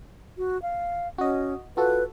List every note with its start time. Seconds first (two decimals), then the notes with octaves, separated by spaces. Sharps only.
0.38 F#4
0.62 F5
1.18 C#4 F#4 D#5
1.77 F4 F#4 A4 B4